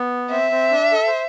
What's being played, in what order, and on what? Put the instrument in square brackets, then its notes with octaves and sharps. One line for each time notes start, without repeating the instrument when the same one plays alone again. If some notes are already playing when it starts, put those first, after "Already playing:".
Already playing: [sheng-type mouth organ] B3
[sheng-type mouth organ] C4 [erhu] E5
[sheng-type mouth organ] C4
D4
A4
C5